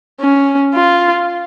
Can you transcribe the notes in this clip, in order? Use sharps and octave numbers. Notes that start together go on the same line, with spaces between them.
C#4
F4